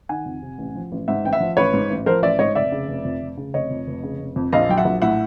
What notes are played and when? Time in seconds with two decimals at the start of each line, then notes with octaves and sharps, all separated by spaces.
0.09 D#3 F#5 G#5
0.26 F2
0.42 C3
0.58 A1
0.75 F3
0.92 A1
1.08 G#2 E5 F#5
1.24 A1 G5
1.33 E5 F#5
1.40 F3
1.57 A1 B4 C#5
1.73 G#2
1.90 A1
2.06 F3 A#4 C5
2.23 A1 D5 E5
2.39 G#2 C#5 D#5
2.55 F1 D5 E5
2.72 C#3
2.88 F1
3.05 F2
3.22 F1
3.37 C#3
3.54 F1 C#5 D#5
3.70 F2
3.87 F1
4.03 C#3
4.19 F1
4.36 F2
4.53 A#1 D#5 F5
4.69 F#3 G5
4.78 E5 F#5
4.85 A#1
5.02 A2 E5 F#5